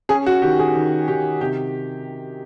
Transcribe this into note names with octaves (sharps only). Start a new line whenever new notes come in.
C#4 G#4
F#4
D#3 G4
G#4
D#3
D#3 G4
C3 G4